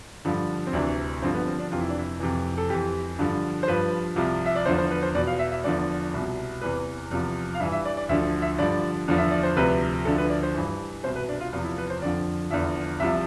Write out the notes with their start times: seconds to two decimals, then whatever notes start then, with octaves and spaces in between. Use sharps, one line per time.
0.25 G2 D3 F3
0.67 C4
0.73 D2 C3 E3 D4
1.22 G2 D3 F3 C4
1.35 B3
1.47 C4
1.59 D4
1.72 F2 C3 E3 F4
1.81 E4
1.90 D4
1.99 E4
2.20 F2 C3 E3
2.58 A4
2.70 F2 E3 G4
3.19 G2 D3 F3
3.63 C5
3.68 G2 F3 B4
4.16 C2 C3 F3
4.46 E5
4.55 D5
4.66 E2 D3 F3 C5
4.78 C5
4.91 B4
5.03 C5
5.15 E2 B2 D5
5.27 F5
5.39 E5
5.52 E5
5.64 E2 D3 F3 D5
6.13 C2 B2
6.61 E2 C3 E3 B4
7.11 E2 C3 F3
7.55 F5
7.60 G2 E5
7.63 E3
7.72 E5
7.85 D5
7.97 D5
8.09 D2 D3 F3 E5
8.42 E5
8.58 G2 D3 F3 D5
9.08 E2 D3 F3
9.18 E5
9.31 D5
9.43 C5
9.56 D2 C3 F3 B4
10.05 D2 D3 F3 A4
10.18 B4
10.30 D5
10.43 C5
10.54 G2 E3
11.03 C2 B2 C5
11.16 B4
11.28 D4
11.40 F4
11.53 E2 C3 F3 F4
11.65 E4
11.78 B4
11.90 C5
12.02 F2 D3 F3 D5
12.50 E2 D3 F3 E5
13.00 C2 C3 F3 E5